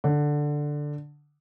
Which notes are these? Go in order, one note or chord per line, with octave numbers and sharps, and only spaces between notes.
D3